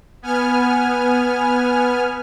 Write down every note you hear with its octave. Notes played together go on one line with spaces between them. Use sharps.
B3 G#5 F6